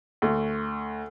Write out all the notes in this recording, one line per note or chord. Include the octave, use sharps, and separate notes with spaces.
D2